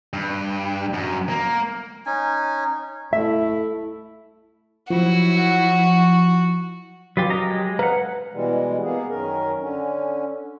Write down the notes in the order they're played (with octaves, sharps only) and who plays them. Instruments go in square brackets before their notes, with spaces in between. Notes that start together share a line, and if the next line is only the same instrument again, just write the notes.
[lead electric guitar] G2
F#2
A#3
[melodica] C#4 D#4 G#5
[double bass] A3 E4 [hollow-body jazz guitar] E5
[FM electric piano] F3 [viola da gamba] F#3 E4 [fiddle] F#4
[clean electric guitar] F#3 G4 [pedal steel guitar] C#4 F4 B4
[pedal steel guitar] A#4 D#5 A#5
G#3
[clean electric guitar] B4 A#5 [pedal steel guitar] F5 F#5
[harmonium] B2 E3 G3 G#3
A#3 B3 G#4
F#2 D#3 C#4 A#4
D3 C#4